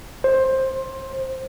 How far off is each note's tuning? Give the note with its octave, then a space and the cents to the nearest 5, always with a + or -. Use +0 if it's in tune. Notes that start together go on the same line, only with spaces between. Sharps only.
C5 +15